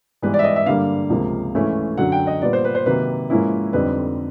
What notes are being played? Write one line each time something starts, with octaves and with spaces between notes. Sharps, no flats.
G#2 E3 G3 B3 B4
D5
E5
D#5
E5
G2 D3 G3 A#3 F5
C#2 C3 F3 A#3
G#2 E3 A3 C#4 E4
F#2 D3 F#3 F#5
G5
D#5
A#2 G3 B3 D5
C5
B4
C5
C3 D#3 F#3 A#3 B4
G#2 F3 A#3 C#4 E4
F2 D3 G3 C4 D#4 B4